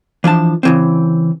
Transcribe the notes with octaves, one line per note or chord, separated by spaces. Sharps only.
E3 F3 D4 A5
C#3 E3 C4